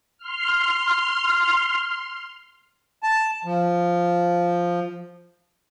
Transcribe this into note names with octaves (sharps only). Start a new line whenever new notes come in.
C6 F6
A5
F3